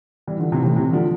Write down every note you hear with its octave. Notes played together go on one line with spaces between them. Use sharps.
E3 G3
D3 F3
C3 E3
A2 C3
C3 E3
D3 F3